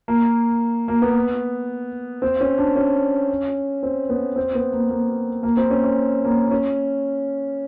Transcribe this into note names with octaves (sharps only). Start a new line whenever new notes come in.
A#3
A#3
B3
C4
C#4
D4
C#4
C4
B3
C4
B3
A#3
A#3
A#3
C4
C#4
C#4
A#3
C#4